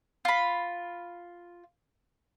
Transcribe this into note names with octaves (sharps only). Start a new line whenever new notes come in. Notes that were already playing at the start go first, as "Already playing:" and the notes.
F4 B5